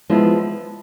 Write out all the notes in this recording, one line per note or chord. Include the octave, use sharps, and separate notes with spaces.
F3 G#3 B3 E4